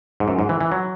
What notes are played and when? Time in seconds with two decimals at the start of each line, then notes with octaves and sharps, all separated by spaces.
0.20 G#2
0.28 F#2
0.39 G#2
0.49 E3
0.61 E3
0.72 F#3